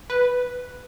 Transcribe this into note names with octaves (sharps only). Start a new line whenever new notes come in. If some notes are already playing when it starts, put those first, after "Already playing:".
B4